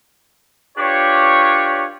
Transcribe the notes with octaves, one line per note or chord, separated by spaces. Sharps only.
D4 F4 G4 B4 C#5